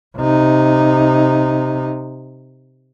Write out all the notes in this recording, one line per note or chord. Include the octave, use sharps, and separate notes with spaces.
C3 D#4